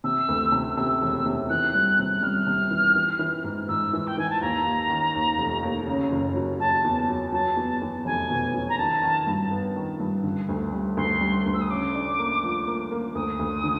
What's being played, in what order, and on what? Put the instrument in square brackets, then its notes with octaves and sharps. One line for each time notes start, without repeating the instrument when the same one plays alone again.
[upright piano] C3 [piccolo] E6
[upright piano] D2
C3
[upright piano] C3 [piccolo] E6
[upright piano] E1
C3
[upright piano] E3 [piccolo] F#6
[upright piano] G3
C3
[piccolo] F#6
[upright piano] G3 [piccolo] F6
[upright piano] C3
E3
E3
E3
G#2
[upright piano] G#2 [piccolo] E6
[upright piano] E3
[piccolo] G5
[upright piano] E3 [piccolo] G#5
[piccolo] A5
[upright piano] D#2 [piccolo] A#5
[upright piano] D#2
D#3
D#2
F1
D#2
C#3
F#1
F#3
[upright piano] F#3 [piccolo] A5
[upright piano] E2
F#3
[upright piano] F#3 [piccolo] A5
[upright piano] E2
E2
[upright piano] F1 [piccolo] G#5
[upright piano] B2
F#3
[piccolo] A#5
[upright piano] D#3 [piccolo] A5
[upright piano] D#3
G2
B3
D#3
G2
D3
D2
G3
[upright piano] D2 [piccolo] C6
[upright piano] G3
D2
[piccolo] E6
D#6
[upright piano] C#3 [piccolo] D6
[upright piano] D4
A#3
F3
A#3
A#3
[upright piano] D2 [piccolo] D#6
[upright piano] D2
D3